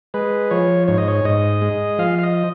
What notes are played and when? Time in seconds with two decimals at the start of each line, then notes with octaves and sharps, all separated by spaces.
0.14 G#3 B4
0.51 F3 C#5
0.88 G#2 C#5
0.98 D#5
1.08 C#5
1.24 G#2 D#5
1.62 G#3
1.98 F3 F5
2.19 F5
2.23 D#5